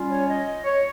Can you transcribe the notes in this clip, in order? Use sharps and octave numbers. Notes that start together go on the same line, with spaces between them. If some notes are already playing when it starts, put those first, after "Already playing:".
Already playing: G3 C#4 F4
C#5
D#5
C#5